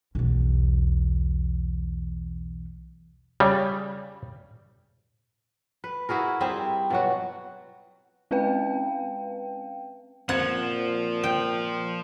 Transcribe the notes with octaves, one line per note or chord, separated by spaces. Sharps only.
B1 E2
C#3 G3
B4
E4 F#4 G#4 A#4
G3 C4 G#4 E5
B2 F#3 F#4
G#3 C4 C#4 B4 F5 G5
A#2 F3 C4 F#5 G#6
G5